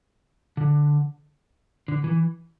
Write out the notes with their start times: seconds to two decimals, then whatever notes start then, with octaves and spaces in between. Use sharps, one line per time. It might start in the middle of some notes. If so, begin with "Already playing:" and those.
0.57 D3
1.88 D3
2.04 E3